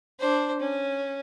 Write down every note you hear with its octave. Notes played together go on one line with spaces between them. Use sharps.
D4 C5
C#4